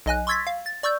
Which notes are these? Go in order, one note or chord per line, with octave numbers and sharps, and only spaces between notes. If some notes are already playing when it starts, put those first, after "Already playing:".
B1 D#5 G#5 F#6
C6 C#6 E6 G#6 A6 B6
F5
A6
D5 C#6 E6 G6